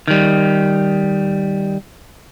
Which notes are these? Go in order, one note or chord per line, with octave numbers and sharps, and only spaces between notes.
D#3 G3